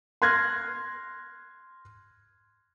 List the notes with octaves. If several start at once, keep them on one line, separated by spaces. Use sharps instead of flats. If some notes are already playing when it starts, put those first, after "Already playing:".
C6 F6 F#6 G#6 A#6